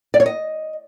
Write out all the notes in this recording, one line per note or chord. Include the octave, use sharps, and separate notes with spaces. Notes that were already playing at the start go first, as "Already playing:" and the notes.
D5
C#5
D#5